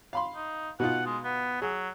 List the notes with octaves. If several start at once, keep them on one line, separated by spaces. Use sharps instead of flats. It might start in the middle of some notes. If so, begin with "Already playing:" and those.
F5 B5 C6
D#4
B2 D#4 F4 F#5
G#3
B3
F#3 G#4